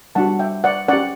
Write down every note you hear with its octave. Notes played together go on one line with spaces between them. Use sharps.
G3 D4 F#4 F#5 A5
E5 G5
D5 F#5
C#4 G4 D5 F#5